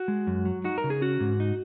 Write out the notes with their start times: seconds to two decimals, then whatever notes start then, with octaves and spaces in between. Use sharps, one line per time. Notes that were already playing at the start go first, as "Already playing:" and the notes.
Already playing: F#4
0.08 G#3
0.27 F#2
0.45 F#3
0.64 D#4 F#4
0.78 A#4
0.84 C#3
0.90 G#4
1.01 C#4 F#4
1.20 G#2
1.40 D#4